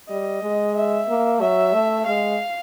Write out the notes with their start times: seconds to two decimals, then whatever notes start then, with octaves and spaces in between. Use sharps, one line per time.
0.08 G3 D#5
0.42 G#3
0.75 E5
1.08 A#3
1.40 F#3 E5
1.73 A3
2.06 G#3 F5